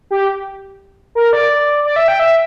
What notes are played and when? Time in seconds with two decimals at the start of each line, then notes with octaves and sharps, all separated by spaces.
0.11 G4
1.15 A#4
1.33 D5
1.85 D5
1.96 E5
2.08 G5
2.20 E5